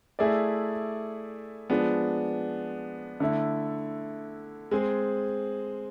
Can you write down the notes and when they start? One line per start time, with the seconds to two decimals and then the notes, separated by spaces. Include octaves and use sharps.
0.19 A3 E4 G#4 D5
1.70 F3 G#3 B3 D4
3.20 D3 A3 E4
4.71 G#3 C4 G#4